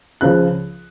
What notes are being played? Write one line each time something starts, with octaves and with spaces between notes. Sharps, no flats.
C#2 C#3 F3 F#6